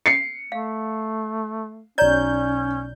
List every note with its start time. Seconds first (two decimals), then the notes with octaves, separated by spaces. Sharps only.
0.06 C7 C#7
0.52 A3 F5
1.98 B1 C#4 C#5 D5 A#5 G6